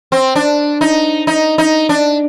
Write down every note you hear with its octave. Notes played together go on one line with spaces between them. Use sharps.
C4
D4
D#4
D#4
D#4
D4